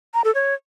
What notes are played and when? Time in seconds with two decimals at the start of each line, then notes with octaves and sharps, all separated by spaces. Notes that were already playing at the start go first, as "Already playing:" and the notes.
0.14 A#5
0.24 A4
0.35 C#5